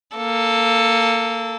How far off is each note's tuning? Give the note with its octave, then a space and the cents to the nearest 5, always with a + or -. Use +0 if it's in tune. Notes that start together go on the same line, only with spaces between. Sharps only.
A#3 -15 A4 +0